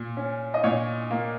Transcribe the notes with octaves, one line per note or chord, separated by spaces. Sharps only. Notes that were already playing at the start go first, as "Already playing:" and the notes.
Already playing: A#2
C#4
D#5
A#2 C#5
A#3